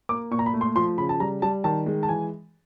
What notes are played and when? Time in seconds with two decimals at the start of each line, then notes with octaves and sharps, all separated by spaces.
0.09 A#3 D6
0.31 A#2 C#6
0.39 A#5
0.46 B5
0.53 A3
0.61 C6
0.76 F3 C6
0.98 C#3 B5
1.09 A5
1.20 G3 A#5
1.42 G3 A5
1.64 D#3 A5
1.86 G#3
2.03 A5
2.08 E3 G#5